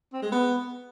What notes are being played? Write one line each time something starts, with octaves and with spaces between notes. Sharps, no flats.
C4
G#3
B3